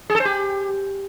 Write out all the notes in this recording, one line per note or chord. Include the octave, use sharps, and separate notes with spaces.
G#4
A4
C5
G4